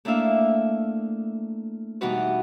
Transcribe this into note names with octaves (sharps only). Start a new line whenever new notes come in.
A3 A#3 D4 E4 E5 F5
B2 E3 G3 D#4 F#4 B4